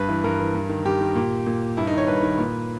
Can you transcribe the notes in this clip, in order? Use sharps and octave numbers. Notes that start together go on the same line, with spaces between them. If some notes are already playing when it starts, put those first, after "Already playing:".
Already playing: G2 B4
E3
G2 A#4
E3
G2
D#3
G2 G4
D#3
A#2
A#2
G2 E4
D#4
D#3
C#5
G2 B4
D#3
A#2